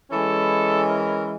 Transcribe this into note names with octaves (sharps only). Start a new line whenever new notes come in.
E3 G#3 C#4 E4 A4
A#4